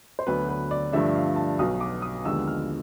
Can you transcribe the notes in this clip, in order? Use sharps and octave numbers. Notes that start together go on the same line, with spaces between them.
C5
D2 D3 F#3 B3 B4
B4
D5
G2 D3 F3 A3 D4 E5
F5
A5
B1 B2 F#3 D#6
D6
D#6
D#2 D3 F3 G#3 B3 E6
F6